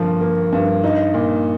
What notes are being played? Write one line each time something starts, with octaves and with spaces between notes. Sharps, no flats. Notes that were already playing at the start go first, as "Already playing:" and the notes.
Already playing: G2 D3 F3 A#3
A#3
G2
D#4
A#2